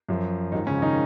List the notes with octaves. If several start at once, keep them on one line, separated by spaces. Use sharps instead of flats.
F#2 F3
G#2 D#3 F3 D#4
C#3 C#4
D#3 D#4